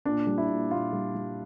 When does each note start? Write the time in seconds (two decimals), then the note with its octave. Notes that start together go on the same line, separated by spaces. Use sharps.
0.05 A#2 D4
0.27 G3
0.38 E4
0.49 A#2
0.71 A#2 F4
0.93 G3
1.14 G3